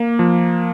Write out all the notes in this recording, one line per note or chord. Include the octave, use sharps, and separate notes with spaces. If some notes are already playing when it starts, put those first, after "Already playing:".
Already playing: A#3
F3